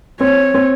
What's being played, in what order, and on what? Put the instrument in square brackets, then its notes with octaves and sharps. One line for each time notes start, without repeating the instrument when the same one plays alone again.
[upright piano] C4 [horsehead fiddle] C#5
[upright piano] C4